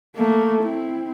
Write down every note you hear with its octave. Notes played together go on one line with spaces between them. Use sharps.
A3 A#3
C4 E4